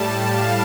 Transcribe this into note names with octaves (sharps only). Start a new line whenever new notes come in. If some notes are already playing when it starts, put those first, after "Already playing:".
Already playing: A2 G3 A5
F5